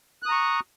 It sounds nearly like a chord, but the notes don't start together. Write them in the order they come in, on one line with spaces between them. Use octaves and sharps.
F#6 D#6 A#5 C#6